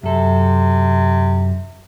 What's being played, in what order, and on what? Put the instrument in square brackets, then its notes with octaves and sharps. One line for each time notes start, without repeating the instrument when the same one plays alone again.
[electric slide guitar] F#2 A4 [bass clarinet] C3